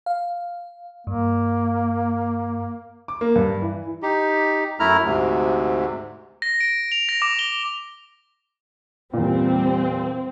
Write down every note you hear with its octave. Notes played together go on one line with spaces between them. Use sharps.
F5
G2 A#3
D6
A#3
G2
E3
D#4 G4
F#2 A3 E4 A#5 F6
D2 G#2 C3
A#6
D7
F7
A#6
D6
G7
E2 A#2 G3 C4